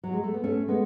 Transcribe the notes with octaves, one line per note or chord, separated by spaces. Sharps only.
F#3
G#3
A3
B3
A3 C#4
G#3 B3